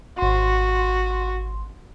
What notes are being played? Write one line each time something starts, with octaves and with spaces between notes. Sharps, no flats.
G#1 F#4 C6